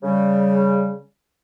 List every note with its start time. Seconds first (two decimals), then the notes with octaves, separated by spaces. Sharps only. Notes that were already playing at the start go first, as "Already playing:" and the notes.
0.03 C#3 G3